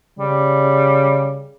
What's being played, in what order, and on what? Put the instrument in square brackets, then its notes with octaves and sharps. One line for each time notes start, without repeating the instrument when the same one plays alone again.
[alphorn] C#3 [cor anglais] G3